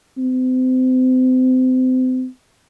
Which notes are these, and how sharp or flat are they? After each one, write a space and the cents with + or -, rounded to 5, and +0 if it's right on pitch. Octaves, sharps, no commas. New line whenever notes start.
C4 -35